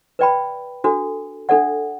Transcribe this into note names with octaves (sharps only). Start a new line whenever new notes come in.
B4 D5 G5 B5
D4 F#4 A4
D4 A4 D5 F#5